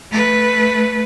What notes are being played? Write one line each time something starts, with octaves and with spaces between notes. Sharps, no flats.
A3 B4